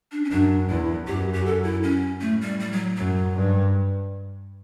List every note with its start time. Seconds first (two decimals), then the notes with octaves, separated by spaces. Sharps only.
0.12 D4
0.25 C#4
0.30 F#2 D4
0.69 E2 E4
1.07 F#2 G4
1.34 G4
1.46 A4
1.64 E4
1.83 C#4
2.21 A2 A3
2.41 G3
2.60 G3
2.72 F#3
2.97 F#2 F#3
3.36 G2